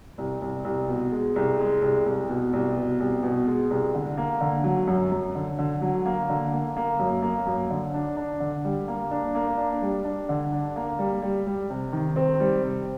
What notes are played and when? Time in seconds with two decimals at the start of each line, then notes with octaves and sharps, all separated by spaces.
0.18 C2
0.42 C2
0.65 C2
0.88 B2
1.12 G#3
1.36 C2
1.59 G#3
1.82 C2
2.06 C2
2.29 B2
2.53 C2
2.76 B2
3.00 C2
3.23 B2
3.47 G#3
3.71 C2
3.94 D3
4.17 A#3
4.41 D3
4.64 F#3
4.87 F#2
5.11 F#2
5.35 D3
5.59 D3
5.82 F#3
6.06 A#3
6.29 D3
6.53 A#3
6.77 A#3
6.99 F#2
7.22 A#3
7.46 F#2
7.70 D3
7.94 D4
8.17 D4
8.40 D3
8.65 G3
8.88 A#3
9.11 D4
9.35 A#3
9.58 D4
9.82 G3
10.05 D4
10.29 D3
10.52 D4
10.76 A#3
10.99 G3
11.22 G3
11.46 G3
11.70 C3
11.92 D#3
12.16 C4
12.40 G3
12.63 C3